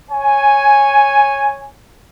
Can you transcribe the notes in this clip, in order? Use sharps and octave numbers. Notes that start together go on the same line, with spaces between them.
C#5 G#5